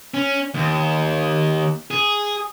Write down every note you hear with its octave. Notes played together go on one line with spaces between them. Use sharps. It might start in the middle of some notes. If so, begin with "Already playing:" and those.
C#4
D#2
G#4